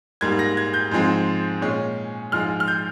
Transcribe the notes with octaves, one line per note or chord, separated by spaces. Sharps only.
G#2 G3 A#3 G#6
A#6
G#6
G6
G#2 F3 G#3 C4
A#2 G#3 C#4
G#2 F3 G#3 F6
F6
G6